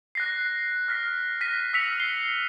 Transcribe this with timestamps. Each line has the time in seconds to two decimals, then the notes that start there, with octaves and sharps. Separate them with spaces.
0.15 F#6 A#6 C7
0.88 F6 A#6 B6
1.41 A#6 B6 D#7
1.73 E6 F6 B6 C#7 F7
2.00 C7 G7